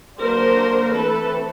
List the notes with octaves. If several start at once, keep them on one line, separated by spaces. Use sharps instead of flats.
D3 F#3 A#3 D4 A#4 C5
E3 A3 C4 A4 B4